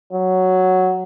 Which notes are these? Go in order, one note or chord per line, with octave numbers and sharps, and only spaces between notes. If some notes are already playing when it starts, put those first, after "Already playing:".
F#3